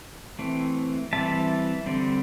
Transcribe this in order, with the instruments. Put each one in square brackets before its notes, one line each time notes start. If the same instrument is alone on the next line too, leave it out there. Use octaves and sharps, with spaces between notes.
[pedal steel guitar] E3 A3 C4
E3 G3 C4 E5 A5
D3 G3 C4